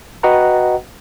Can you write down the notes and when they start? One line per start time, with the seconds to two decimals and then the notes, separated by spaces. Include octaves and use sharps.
0.23 F#4 B4 D#5 F#5 G5 A#5